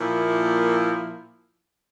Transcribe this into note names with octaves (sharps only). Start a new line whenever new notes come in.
A#2 F3 A#3 E4